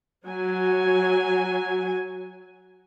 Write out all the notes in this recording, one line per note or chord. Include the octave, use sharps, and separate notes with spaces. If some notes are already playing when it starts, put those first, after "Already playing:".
F#3 G#5